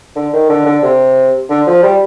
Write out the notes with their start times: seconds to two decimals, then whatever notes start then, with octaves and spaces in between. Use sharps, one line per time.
0.16 D3
0.33 D#3
0.49 D3
0.66 D3
0.83 C3
1.50 D3
1.67 F3
1.83 G3